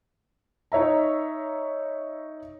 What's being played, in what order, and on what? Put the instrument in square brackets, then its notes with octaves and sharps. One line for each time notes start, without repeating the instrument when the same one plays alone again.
[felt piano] D#4 C#5 E5 A#5